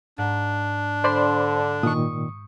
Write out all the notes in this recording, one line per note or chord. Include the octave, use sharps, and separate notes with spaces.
G#2 D4
D3 C5 D5 B5 C6
A#2 D#3 C#6 D#6